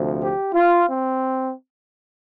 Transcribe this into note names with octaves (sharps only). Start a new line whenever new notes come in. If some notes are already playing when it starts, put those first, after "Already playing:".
Already playing: D2 C3 F3
G4
F4
C4